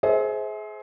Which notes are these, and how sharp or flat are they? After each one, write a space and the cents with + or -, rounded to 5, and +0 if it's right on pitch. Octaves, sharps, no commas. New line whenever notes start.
G#4 +25 C5 +5 E5 -30